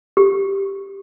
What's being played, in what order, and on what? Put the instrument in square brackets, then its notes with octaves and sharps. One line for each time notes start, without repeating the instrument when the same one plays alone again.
[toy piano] G4